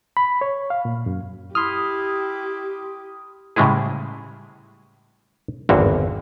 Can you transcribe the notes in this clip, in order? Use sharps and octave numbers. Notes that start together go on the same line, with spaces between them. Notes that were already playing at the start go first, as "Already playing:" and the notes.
B5
C#5
F5
A#2
F#2
E4 G4 C6 D#6 F6
A2 C#3 G3 G#3 E4 G#4
G#1 E2 G2 D3 A#3 F#4